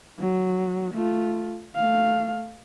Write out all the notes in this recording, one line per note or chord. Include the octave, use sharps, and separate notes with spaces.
F#3
A3 F4
A3 F5